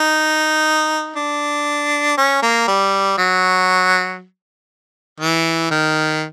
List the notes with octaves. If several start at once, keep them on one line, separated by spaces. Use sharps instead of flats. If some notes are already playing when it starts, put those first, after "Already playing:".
Already playing: D#4
D4
C#4
A#3
G3
F#3
E3
D#3